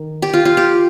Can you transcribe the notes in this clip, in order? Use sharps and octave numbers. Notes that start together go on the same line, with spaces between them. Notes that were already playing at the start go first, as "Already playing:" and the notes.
Already playing: D#3
G4
F4
F4
G4